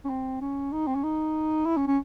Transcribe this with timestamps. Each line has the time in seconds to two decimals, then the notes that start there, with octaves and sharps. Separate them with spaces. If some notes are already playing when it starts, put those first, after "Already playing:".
0.05 C#4
0.09 C4
0.41 C#4
0.72 D#4
0.87 C4
0.95 C#4
1.04 D#4
1.66 E4
1.77 C#4
1.87 C#4